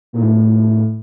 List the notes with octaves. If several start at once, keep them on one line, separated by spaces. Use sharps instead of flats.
A#2
A2